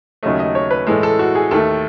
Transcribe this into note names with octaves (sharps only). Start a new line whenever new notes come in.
D#2 C#3 F#3 A3 D#5
D#5
C#5
B4
A2 E3 G#3 A4
A4
F#4
G#4
D#2 D#3 A3 A4